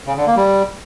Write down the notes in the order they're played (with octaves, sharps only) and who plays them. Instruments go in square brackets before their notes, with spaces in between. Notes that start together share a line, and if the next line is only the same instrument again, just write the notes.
[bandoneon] C#3
D3
A#3
G3